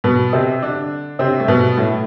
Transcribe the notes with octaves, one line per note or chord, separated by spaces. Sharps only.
B2 B3
C3 C4
D3 D4
C3 C4
A3
B2 B3
A2 A3